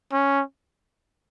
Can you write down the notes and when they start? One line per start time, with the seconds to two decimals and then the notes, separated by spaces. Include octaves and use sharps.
0.13 C#4